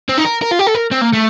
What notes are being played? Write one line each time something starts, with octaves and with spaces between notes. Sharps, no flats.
C4
D#4
A#4
A#4
F4
G4
A4
A#4
C4
A#3
A3